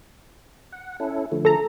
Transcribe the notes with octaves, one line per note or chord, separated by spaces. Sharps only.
F#5
C#4 E4 A4
D3 F3 A3
A4 A#5